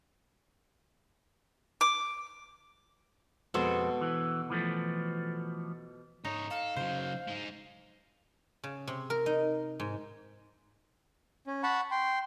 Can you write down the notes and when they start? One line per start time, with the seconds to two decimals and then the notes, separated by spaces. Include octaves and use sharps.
1.81 D6
3.54 F2 B2 G#3 B3 A4 C5
4.01 E3
4.50 E3 F3 A3
6.25 G#2 D#4 C#5
6.50 A4 F5
6.76 C#3 F#3 C5
7.28 G#3 D#4
8.64 C#3
8.87 C3
9.10 A#4
9.26 D#4
9.80 G#2
11.47 C#4
11.63 F#5 A5 B5 C#6
11.91 G5 C6